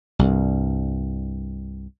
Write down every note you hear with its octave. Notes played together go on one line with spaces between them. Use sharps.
C2 G2